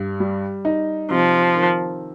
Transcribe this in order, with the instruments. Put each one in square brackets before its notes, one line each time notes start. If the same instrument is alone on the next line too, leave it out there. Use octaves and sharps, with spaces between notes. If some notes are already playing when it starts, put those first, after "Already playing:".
Already playing: [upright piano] G2
G3
D#4
[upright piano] C3 [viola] F3
[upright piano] D#3